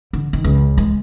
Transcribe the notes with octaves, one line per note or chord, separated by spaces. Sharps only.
D3
D#3
C#2
G#3